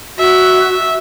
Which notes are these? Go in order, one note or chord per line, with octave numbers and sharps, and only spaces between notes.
F#4 E5